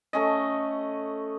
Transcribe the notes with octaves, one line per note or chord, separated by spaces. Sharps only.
A3 C#4 D#5